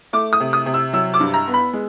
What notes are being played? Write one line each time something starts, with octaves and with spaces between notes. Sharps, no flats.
A3 D6
D#6
C3
D#6
C3
E6
F#3 E6
D6
G2
A#5
B3
B5
G#3